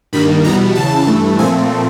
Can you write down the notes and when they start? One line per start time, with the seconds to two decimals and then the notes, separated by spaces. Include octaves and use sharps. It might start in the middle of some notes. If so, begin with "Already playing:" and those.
0.13 G2 D#3 G3 A#3 B5
0.44 E2 B2 G3 B3 A#5
0.75 E2 C#3 E3 A5
1.07 G2 E3 A3
1.39 A#2 F3 A3 C4 G#5